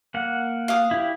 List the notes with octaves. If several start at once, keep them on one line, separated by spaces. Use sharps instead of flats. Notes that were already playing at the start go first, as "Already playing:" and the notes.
A#3 F#5
F5 D#6
E4 G4